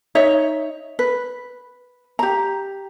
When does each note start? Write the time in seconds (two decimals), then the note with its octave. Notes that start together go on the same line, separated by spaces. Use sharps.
0.15 D#4 C#5 D#5 E5
0.99 B4
2.19 G4 A#5